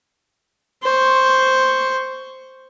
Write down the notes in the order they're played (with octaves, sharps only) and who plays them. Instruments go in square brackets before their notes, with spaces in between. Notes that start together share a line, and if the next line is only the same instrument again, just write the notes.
[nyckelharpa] C5 C#6